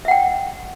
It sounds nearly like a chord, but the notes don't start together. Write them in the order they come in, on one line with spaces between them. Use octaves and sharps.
E5 F#5 G5